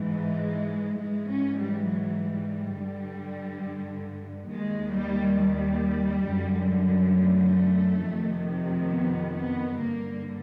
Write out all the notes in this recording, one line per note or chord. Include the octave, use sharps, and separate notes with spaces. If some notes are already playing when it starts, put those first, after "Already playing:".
Already playing: G#2 E3
G#3
G#2 E3 G#3
C#4
G3
F#3
G3
G2 D3
D#2 D#3 G#3
G3
G3
F#2 D3
A3
F2 C3 D#3
B3
B3
G2 D3 A#3